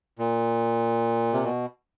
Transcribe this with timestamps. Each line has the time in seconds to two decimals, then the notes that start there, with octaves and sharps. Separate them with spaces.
0.19 A#2
1.33 C3
1.44 B2